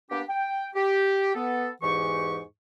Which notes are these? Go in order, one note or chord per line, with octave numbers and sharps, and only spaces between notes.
A#3 B3 D4 G4
G5
G4
B3 A4
E2 G#2 E3 G4 C#6